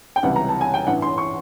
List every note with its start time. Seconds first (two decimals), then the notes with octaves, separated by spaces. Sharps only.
0.16 G5
0.23 C#2 C3 E3 G3 F#5
0.36 A#5
0.49 A5
0.61 G#5
0.74 G5
0.87 A1 G2 E3 F#5
1.02 C6
1.18 C#6